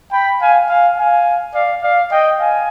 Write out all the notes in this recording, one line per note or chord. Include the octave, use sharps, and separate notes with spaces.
G5 B5
F5 G#5
F5 G#5
F5 G#5
D5 F5
D5 F5
D#5 G5
F5 G#5